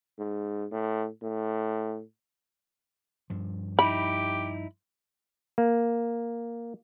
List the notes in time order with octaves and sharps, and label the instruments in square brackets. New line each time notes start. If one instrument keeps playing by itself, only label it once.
[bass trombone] G#2
A2
A2
[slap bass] G2 F3
[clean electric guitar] D#4 E4 [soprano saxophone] G4 [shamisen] B5
[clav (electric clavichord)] A#3